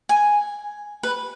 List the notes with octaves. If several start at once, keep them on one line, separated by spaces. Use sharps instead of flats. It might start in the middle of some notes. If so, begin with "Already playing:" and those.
G#5
B4